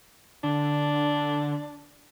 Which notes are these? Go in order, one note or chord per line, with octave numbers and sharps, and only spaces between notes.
D3 D4